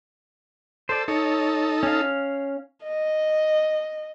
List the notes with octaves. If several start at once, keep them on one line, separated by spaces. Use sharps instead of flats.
A4 C5 D5
D#4 A4 C#5
C#4 F5
D#5